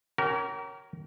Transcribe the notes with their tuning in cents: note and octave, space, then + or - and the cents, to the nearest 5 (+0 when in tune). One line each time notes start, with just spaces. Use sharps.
C#4 +0 G4 -45 A#4 +0